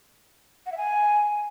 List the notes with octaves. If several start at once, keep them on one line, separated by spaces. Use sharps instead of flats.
F#5
E5
G#5